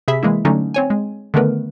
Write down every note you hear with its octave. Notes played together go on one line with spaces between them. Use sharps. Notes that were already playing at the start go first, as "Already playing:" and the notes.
C3 G#4 E5 B5 B6
E3 G#3 A#3 E4
D3 F#3 A3 C#4 D#4
C4 C#5 G#5
G#3
D3 D#3 A3 B3 A#4 B4